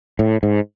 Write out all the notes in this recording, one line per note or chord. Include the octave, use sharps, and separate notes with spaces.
A2
G#2